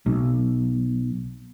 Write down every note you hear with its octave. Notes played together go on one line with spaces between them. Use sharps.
B1